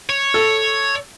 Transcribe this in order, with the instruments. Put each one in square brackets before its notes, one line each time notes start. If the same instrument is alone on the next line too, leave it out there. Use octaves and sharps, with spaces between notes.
[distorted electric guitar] C#5
[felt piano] A4